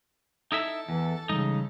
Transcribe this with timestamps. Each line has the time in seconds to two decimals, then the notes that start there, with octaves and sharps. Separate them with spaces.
0.52 D#4 E4 A4 E5
0.89 E2 E3
1.29 C#3 E3 G3 G#3 D#4